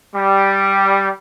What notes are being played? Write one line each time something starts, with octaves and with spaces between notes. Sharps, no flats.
G3